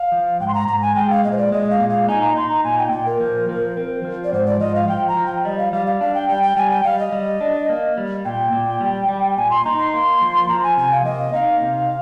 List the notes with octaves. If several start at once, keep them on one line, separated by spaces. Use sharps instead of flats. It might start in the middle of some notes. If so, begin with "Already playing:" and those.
Already playing: F5
F3
G#2 G5
C6
A#5
G#2 A#5
G#5
G#3 G5
F5
A#2 D#5
C5
D5
G#3 D#5
F5
A#2
F5
D#4 G#5
A#5
D#4 C6
A#5
A#2 G#5
G5
A#2 G5
A#4
F3
F3
C4
F3
D5
G#2 C5
D5
F3 D#5
F5
F3 G5
A#5
F3
G5
G3 D#5
F5
G3 F5
F5
D4 F5
G5
G3 G5
G5
G3 G#5
G5
G3 F5
D#5
G3
D4
A#3
G3
A#2 G5
A#2
G3
G3
A#2 G#5
C6
D#4 A#5
C6
A#3
F3
F3 A#5
G#5
C3 G#5
F5
A#3 D#5
D#4 F5
C3